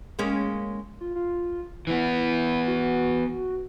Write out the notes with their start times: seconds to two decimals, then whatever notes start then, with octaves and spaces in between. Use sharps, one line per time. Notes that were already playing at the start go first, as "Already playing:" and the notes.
0.19 G#3 A#3 C#4
1.00 F4
1.16 F4
1.87 E3 B3 E4
2.68 F#4